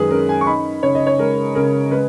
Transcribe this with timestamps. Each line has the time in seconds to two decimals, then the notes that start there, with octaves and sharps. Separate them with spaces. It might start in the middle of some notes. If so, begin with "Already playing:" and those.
Already playing: F#2 D#3 G#3 G#4 B4
0.11 C#4 A#4
0.29 G#5
0.41 C#6
0.47 D#4 B5
0.83 C#3 C#5
0.95 D#5
1.07 C#5
1.19 G#3 A#4
1.55 C#3 A#4
1.91 G#3 B4